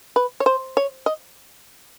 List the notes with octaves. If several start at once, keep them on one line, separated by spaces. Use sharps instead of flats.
B4
C#5
C5
C#5
D#5